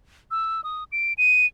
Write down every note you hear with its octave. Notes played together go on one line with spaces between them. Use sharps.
E6
D#6
D7
D#7